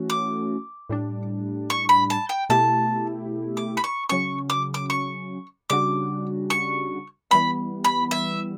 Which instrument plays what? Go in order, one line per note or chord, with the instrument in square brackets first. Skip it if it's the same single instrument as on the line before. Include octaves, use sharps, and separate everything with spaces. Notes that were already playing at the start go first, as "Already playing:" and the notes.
Already playing: [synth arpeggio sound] E3 A3 C#4 F#4
[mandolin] D6
[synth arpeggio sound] A2 G3 D4
[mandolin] C#6
B5
A5
G5
[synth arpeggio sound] B2 A3 E4 G4 [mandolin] A5
[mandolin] D6
B5
C#6
[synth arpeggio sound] C#3 F#3 C#4 [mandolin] C#6
[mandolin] D6
D6
C#6
[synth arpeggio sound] C#3 G3 D4 F#4 [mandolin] D6
[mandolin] C#6
[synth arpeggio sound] E3 G3 B3 [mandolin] B5
[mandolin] B5
E5